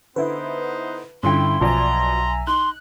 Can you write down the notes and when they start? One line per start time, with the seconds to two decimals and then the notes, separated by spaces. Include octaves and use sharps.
0.16 D3 B3 D#4 E4 B4 C5
1.23 G2 D3 C#4 E4 F4 G5 C6
1.60 B1 B2 F3 D5 E5 G#5 A#5
2.47 D#4 C6 F#6